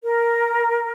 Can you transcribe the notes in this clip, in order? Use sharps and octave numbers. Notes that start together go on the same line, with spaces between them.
A#4